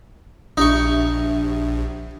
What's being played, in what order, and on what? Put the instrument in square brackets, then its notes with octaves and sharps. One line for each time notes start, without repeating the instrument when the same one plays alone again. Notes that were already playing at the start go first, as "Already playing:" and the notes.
[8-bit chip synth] A#1 [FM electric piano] D4 G4 E5 [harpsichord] D#4 C#6